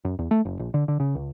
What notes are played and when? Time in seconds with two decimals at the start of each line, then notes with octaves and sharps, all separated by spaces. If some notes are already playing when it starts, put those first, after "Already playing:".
0.05 F#2
0.19 E2
0.31 A3
0.45 F#1
0.59 A#1
0.74 D3
0.88 D3
1.00 C#3
1.15 C#2